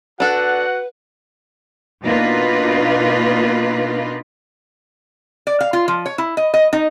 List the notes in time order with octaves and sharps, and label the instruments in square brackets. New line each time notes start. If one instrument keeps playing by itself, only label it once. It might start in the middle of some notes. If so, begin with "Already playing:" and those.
[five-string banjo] D4 A4 [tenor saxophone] F#4 [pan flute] B4 [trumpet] F#5
[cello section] B2 A#3 D4 D#4 F4 B4
[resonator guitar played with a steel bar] D5
F5
F4
F3
C#5
E4
D#5
D#5
D#4